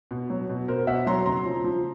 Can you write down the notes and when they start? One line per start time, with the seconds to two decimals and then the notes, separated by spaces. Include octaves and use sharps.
0.11 B2
0.30 F#3
0.49 B2
0.68 B2 A#4 C5
0.87 B2 E5 F#5
1.06 F#3 A#5 C6
1.26 C#3 A#5 C6
1.45 F3
1.64 F3